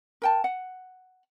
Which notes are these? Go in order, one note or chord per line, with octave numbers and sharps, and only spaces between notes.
A#4 G5 A5
F#5